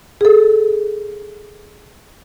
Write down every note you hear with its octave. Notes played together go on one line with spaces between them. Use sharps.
G#4 A4